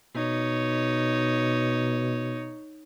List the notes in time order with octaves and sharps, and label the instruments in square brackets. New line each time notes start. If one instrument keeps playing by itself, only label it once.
[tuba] B2 [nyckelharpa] D#4 C#5